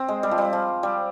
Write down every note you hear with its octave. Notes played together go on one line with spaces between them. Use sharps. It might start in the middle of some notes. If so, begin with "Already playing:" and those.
Already playing: C4
G#3
G3
F3
G3
F3
G3